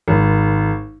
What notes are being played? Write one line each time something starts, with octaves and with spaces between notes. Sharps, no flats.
G#1